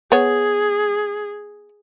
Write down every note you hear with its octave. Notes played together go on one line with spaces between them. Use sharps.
B3 G#4 C#5